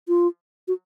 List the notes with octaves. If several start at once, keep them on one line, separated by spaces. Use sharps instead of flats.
F4
F#4